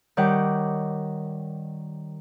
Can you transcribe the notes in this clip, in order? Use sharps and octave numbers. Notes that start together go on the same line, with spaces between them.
D#3 G3 C#5 F#5 D6 G6